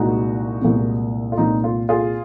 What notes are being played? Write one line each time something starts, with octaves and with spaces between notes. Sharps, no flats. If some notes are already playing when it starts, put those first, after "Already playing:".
Already playing: C2 A#2 G#3 C4 D#4 F#4
C2 A#2 G#3 C4
F4
C2 A#2 G#3 C4 D#4
F4
F4 G#4